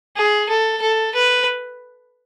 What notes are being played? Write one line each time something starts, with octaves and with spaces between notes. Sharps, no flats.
G#4
A4
A4
B4